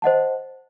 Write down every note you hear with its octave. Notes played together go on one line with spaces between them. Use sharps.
C5 D#5 F#5 A5